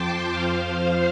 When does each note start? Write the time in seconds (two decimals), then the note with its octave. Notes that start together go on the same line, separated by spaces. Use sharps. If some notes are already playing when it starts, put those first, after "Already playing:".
Already playing: F2 F3 G5 A5 C6 D6
0.31 F2 F3 C5 F5
0.69 C5